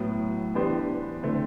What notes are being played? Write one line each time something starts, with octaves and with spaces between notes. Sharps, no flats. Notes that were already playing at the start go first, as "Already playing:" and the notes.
Already playing: A2 F#3 B3
E3 B3 D4 G4 C5
D3 A3 C4